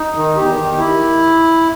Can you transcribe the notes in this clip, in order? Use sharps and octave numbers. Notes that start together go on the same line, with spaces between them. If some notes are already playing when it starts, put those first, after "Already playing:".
Already playing: D#4
D#3
E2 G4
D#3
E4